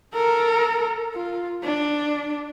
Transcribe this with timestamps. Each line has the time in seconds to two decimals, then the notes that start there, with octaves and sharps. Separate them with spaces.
0.14 A4 A#4
1.14 F4
1.63 D4